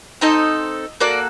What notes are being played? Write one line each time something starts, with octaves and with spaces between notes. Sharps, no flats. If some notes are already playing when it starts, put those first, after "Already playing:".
C4 D#4 A4 D#5
A#3 F#4 A4 D5